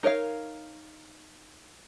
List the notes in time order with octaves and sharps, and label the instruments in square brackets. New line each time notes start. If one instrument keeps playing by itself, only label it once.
[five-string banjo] D#4 A#4 C#5 D#5 F5